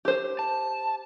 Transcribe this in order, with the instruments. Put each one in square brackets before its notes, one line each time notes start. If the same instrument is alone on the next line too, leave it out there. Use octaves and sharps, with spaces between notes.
[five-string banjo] G4 C5
[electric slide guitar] A5